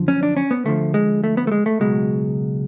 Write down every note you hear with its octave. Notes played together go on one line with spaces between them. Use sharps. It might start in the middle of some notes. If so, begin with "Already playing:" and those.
Already playing: F#2 D3 F3
C#4
D4
C#4
B3
D2 D3 F3 A3
G#3
A3
B3
A3
G#3
A3
C#2 B2 F#3 G#3